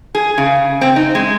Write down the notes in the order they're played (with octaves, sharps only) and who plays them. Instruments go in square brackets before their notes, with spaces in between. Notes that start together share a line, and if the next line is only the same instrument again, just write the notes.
[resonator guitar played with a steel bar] G#4
C#3
C4
D#4
G#3